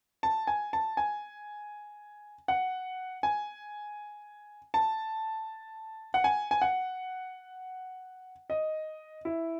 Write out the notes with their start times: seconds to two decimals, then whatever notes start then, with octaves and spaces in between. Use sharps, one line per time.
0.23 A5
0.47 G#5
0.73 A5
0.97 G#5
2.48 F#5
3.23 G#5
4.74 A5
6.14 F#5
6.24 G#5
6.51 G#5
6.62 F#5
8.50 D#5
9.25 E4